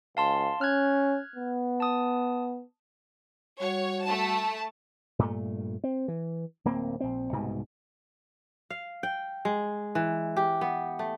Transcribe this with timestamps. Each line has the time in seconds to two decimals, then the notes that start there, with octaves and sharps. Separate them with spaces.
0.17 C#2 F5 A5 C6
0.61 C#4 F6 F#6 G#6
1.35 B3
1.80 A5 D#6
3.60 G3 F#4 C#5 F#5
4.03 A3 A5
5.19 G2 A#2 A3
5.84 C4
6.08 E3
6.65 D1 A#3 C4
7.00 A#1 C4
7.33 C2 G#2 B2
8.70 F5
9.03 G5
9.45 G#3
9.95 E3
10.37 G4
10.61 B3
10.99 A3